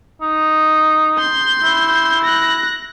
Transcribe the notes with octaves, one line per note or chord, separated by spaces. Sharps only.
D#4
C6 G6
E4
F#6 A#6